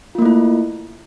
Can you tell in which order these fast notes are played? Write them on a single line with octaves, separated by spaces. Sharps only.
F4 A#3 A3 E4